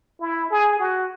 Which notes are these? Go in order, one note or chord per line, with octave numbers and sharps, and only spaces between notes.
E4
G#4
F#4